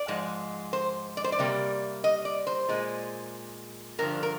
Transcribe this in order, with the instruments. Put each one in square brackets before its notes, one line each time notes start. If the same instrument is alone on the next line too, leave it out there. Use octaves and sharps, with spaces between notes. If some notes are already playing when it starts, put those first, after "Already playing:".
Already playing: [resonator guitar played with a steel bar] D5
G#2 F3 G#3
C5
D5
C5
D5
C3 G3 A#3
D#5
D5
C5
A#2 G#3
G2 D3 F3 A#4
A#4